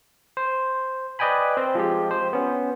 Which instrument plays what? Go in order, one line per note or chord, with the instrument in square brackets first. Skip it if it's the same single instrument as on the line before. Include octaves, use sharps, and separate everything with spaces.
[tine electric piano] C5
B4 D5 D#5 G5 G#5 B5
C4
F3 G#3 G4
C5
B3 C#4